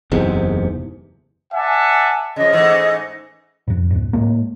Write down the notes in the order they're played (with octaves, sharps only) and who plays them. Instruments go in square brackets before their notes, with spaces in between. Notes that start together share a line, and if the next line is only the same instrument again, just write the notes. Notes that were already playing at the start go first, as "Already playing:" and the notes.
[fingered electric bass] F#1 E2 G#2 C3
[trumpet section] D5 E5 F#5 G#5 A5
[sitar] C#3 F3 [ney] D#5
[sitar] G#2 E3 A3
[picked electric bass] F2 G#2
C#2 G#2
A2 G#3 A#3